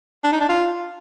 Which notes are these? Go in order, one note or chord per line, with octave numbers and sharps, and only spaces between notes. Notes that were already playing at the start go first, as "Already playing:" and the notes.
D4
D#4
D4
F4